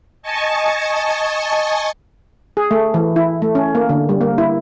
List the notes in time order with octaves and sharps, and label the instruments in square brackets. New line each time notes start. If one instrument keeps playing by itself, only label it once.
[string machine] D#5 G#5 A5 C#6
[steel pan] G#4
A3
E3
E4
A3
C#4
A#3
D3
G3
A#3
E4